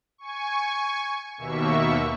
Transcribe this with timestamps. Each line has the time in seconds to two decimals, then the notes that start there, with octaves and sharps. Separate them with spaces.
0.18 G#5 C#6
1.38 D#2 B2 A#3 E5 C#6